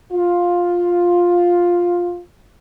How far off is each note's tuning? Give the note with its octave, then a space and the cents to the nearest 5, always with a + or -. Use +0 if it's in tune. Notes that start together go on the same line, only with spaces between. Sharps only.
F4 +10